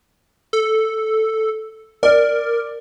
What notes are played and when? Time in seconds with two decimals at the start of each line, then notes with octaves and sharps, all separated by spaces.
0.53 A4
2.03 A#4 D5